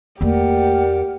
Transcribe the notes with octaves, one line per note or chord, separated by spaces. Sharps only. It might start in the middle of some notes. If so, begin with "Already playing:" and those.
E2 A3 A#3 G4 A#4 D5 F#5